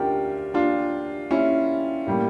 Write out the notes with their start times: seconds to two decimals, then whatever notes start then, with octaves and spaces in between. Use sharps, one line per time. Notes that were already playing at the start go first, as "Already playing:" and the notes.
Already playing: D2 D3 C#4 D4 F4 G4 A#4
0.54 D4 F4
1.31 C#4 E4
2.07 A2 G3 A#3